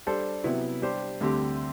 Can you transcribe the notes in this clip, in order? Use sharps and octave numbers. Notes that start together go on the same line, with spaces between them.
G3 D4 A4 C5
C3 F#3 B3 E4
G3 D4 G4 C5
D2 D3 G3 C4 G4